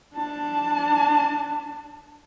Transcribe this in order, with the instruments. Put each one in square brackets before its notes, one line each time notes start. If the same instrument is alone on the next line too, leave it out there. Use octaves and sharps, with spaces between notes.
[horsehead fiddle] D4 A5